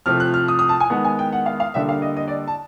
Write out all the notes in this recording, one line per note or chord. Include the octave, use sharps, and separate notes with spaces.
C3 F3 A3 F6
F#6
F6
D#6
D#6
A5
G#5
D#3 G#3 B3 F#5
G#5
G5
F#5
F5
F5
D3 G3 A#3 E5
F5
D#5
D#5
D5
A5